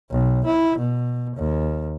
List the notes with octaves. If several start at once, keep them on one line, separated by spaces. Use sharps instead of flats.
B1
E4
B2
D#2